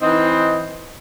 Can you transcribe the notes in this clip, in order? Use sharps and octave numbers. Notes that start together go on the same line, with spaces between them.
E3 C4 D#4 D#5